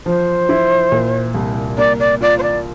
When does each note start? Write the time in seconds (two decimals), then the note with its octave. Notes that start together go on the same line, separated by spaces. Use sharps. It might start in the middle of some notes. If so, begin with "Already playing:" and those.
0.06 F3 C5
0.49 E4
0.92 A#2
1.34 C2
1.78 A#3 D5
2.00 D5
2.21 F4 D5
2.39 C5
2.43 D5